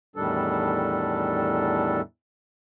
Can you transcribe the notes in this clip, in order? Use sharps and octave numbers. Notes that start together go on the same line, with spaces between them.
E2 A2 D#3 G3 D4 A4